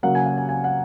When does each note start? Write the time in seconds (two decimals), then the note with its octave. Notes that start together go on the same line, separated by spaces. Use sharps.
0.03 C#3 F#3 A#3 F#5
0.15 G#5
0.26 F#5
0.38 G#5
0.49 G#5
0.64 F#5